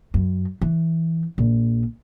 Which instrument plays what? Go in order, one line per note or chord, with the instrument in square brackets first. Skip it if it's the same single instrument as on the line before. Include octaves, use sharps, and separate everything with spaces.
[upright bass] F#2
E3
A#1